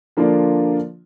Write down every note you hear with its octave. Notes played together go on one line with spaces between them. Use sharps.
D3 F3 A#3 D4 F4